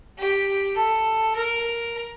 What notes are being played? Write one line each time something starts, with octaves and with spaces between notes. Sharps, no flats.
G4
A4
A#4